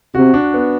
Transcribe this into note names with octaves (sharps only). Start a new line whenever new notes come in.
C3 F#4
D4
B3